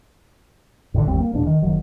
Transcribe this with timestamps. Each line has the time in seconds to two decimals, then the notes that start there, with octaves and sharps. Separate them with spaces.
0.94 F#2 A2 D3
1.06 G1 D#2 G3 C4
1.20 A#3
1.33 E1 E2 A#2 D4
1.47 D#3
1.62 F#1 D#3 F#3